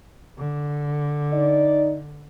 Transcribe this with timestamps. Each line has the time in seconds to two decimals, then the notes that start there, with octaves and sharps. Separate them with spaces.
0.38 D3
1.33 D#4 D5